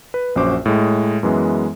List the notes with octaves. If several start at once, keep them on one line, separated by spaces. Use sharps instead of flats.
B4
A#1 F#2 C#4 F#4 C5 D6
A2 G#3
F#2 E3 G#3 B3